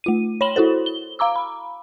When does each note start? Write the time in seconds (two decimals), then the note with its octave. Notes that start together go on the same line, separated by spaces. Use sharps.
0.04 A3 F4 D#7
0.41 C#5 B5 C6 E7 F#7 G7
0.56 E4 F#4 A4 C5
0.86 G7
1.19 F5 A#5 D6 E6
1.36 B5